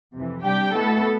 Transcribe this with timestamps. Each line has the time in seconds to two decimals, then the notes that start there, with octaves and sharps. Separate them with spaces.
0.15 F2 C3 E3
0.44 C3 G3 D4 G4 G5
0.74 B2 A3 B3 E4 A4